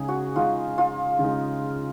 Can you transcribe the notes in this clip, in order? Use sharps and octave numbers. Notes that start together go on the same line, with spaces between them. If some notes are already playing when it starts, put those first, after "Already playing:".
Already playing: C#3 G#3 D#4 G#4
F#4
C#3 G#3 D#4 F4
F4
C#3 G#3 D#4